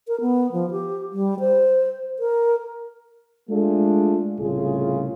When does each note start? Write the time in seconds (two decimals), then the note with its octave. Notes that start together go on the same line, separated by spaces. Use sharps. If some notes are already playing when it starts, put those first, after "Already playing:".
0.08 A#4
0.21 B3
0.52 F3
0.71 G4
1.12 G3
1.40 C5
2.19 A#4
3.50 G#3 A3 D4 F4 G#4 A4
4.40 C2 A2 C#3 F4 G#4